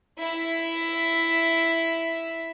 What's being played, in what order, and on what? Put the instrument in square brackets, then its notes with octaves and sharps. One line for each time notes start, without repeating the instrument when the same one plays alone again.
[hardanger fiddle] E4 E5